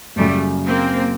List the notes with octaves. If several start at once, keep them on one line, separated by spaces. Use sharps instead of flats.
F#1 F#2 C#3 G3 A3
A#3 C4